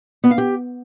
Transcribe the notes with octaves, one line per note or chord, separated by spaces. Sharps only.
B3
F5
G4